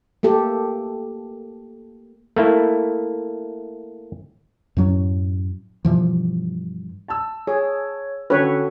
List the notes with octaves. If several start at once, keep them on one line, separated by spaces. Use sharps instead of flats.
A3 A#3 G4 A4
A3 A#3 E4
F#2 A2 F#3 C#4
G2 B2 E3 F3
A5 E6
G#4 C#5
D3 C#4 F#4 A4 B4 C#5 G5